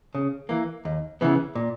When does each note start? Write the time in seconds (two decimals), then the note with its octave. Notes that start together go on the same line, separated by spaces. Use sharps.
0.15 C#3
0.49 E3 A#3
0.85 D#2
1.21 C#3 E3 B3
1.55 A#2